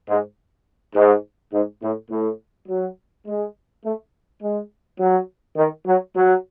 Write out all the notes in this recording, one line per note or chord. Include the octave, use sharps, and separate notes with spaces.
G#2
G#2
G#2
A2
A2
F#3
G#3
A3
G#3
F#3
D#3
F#3
F#3